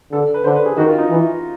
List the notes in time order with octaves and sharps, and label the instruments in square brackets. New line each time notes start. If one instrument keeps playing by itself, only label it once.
[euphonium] D3 [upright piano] A4
[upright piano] B4
[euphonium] D3 [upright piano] C5
[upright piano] B4
G#4
[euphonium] D#3 [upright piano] F#4
[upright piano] F4
D#4
[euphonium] E3